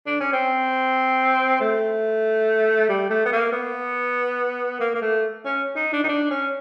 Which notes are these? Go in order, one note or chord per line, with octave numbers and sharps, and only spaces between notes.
D4
C#4
C4
A3
G3
A3
B3
A#3
B3
A#3
A#3
A3
C#4
D#4
D4
D#4
D4
C#4